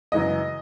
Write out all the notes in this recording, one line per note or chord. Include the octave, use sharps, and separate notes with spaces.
F#2 C#3 E3 G#3 D#5